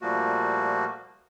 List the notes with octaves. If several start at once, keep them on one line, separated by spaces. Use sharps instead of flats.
A#2 F3 G3 A3 A#3 F#4